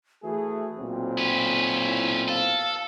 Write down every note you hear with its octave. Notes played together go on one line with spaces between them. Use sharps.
E3 A3 F#4 G#4
B1 A#2 C4
C#4 B4
E4
A4 F5